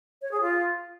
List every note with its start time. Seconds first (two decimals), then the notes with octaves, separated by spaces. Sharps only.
0.22 C#5
0.31 G#4
0.41 F4